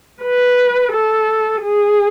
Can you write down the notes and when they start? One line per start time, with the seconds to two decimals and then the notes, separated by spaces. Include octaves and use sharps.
0.23 B4
0.93 A4
1.63 G#4